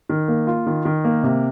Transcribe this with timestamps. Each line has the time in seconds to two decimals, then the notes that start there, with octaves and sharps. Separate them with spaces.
0.09 D#3
0.28 A#3
0.47 F4
0.66 D#3
0.85 D#3
1.04 A#3
1.23 C3